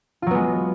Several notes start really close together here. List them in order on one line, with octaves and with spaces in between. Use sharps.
F4 F#3 B3 G#3